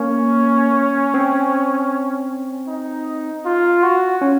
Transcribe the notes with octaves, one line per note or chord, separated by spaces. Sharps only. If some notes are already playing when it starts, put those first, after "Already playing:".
Already playing: A#3 C#4
C4
D#4
F4
F#4
C#4